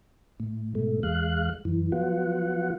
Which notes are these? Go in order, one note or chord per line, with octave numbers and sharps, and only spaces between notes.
A2
G#2 B2 A3
E2 G#3 F5 F#6
F#2 E3
F3 F#3 B3 F4 F#5